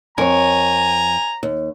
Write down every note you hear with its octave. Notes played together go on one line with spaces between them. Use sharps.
F2 A#4 C#5 G#5 A#5
D#2